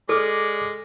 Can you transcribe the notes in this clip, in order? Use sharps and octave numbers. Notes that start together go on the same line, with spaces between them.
G#3 A4 D5 D6 F6